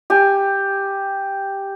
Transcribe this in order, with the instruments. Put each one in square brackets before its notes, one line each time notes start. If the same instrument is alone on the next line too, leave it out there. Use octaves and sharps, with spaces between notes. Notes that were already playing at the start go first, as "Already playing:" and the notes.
[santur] G4 G#5